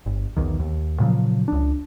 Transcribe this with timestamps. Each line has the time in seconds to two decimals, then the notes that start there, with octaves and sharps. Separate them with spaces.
0.06 G1
0.37 B1 E2 D#3
0.59 D#2
1.00 A#2 C#3 F3 F#3
1.48 C#2 D4